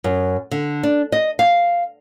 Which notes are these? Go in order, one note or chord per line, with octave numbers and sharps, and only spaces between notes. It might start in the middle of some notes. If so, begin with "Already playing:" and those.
F#2
D3
D4
D#5
F5